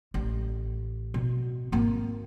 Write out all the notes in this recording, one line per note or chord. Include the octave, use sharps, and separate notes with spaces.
A1
B2
G#1 A#3